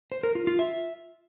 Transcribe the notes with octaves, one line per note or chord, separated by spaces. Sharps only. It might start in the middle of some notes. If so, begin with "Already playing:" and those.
C5
A#4
F4
F4
E5